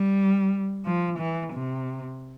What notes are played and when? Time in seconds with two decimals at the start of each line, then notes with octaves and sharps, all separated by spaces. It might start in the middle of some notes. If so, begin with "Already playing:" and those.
Already playing: G3
0.85 F3
1.19 E3
1.54 C3